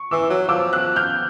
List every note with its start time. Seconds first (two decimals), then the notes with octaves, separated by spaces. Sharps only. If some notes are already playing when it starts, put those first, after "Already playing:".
Already playing: C#6
0.11 E3 D6 E6
0.30 F#3
0.48 F3 D6 E6
0.73 E6 F#6
0.96 F6 G6